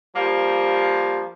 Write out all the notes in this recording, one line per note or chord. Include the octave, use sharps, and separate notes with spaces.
F3 G3 A#3